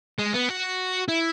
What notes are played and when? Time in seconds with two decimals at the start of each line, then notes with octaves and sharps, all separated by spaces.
0.19 G#3
0.34 B3
0.49 F#4
1.08 E4